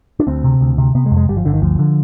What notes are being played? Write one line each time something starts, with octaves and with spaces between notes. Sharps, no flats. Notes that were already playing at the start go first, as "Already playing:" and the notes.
D4
D2 C4
C3
D2
C3
C3 B3
G#3
F2
G#3
G1 G3
F3
G1 D3
D#3
D2 F3
D3